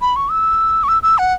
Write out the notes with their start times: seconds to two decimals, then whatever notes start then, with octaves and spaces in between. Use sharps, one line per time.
0.01 B5
0.16 C#6
0.31 E6
0.83 C#6
0.88 E6
1.03 E6
1.18 F#5